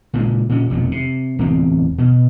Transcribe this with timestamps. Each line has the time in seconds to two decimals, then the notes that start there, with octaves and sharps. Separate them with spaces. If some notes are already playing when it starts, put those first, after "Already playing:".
0.14 A#2 C#3 G3 G#3
0.49 A#2 C#4
0.70 F1 F2 B2 F#3
0.92 C3
1.39 D1 E2 C3 C4
1.98 B2